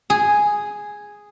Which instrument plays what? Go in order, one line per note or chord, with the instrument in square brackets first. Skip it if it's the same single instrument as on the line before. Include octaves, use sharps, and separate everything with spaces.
[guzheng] G#4